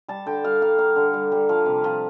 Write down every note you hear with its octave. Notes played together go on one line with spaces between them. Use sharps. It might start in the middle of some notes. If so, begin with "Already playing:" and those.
G3 A5
D3 G5
G3 F5
A#3 F5
A#3 F5
D3
G3
G3
F3 F5
C3
F3